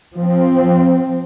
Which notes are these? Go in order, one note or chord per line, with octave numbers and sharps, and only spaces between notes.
F3 C4